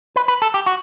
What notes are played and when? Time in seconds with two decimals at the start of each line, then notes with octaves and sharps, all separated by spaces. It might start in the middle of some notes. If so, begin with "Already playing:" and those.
0.16 B4
0.28 B4
0.42 A4
0.54 G4
0.66 F#4